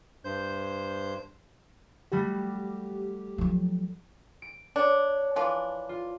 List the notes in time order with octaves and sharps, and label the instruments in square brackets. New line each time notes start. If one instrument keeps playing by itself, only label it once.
[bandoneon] G2 C5 G6
[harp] G3 A3 F#4 [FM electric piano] G4
[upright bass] F3 F#3
[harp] D7
[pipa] D4 [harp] C#5
[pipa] E3 F3 D4
[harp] F4